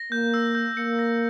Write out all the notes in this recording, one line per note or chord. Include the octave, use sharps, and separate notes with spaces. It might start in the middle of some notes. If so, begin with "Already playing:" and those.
Already playing: A#6
A#3 G6
E6
G6
A#3 C#7
A#6